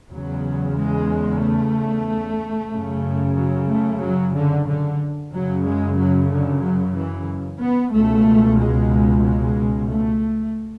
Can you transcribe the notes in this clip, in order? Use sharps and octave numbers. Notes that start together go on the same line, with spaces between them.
E2 C#3 F#3
G#3
A3
F#2 C#3
F#3
A3
F#3
D3
D3
F#2 C#3 F#3
G#3
F#3
D3
F#3
E3
B3
C#2 B2 A3
G#3
G#3
A3